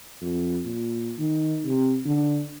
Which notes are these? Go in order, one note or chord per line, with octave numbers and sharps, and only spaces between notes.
F2
A#2
D#3
C3
D3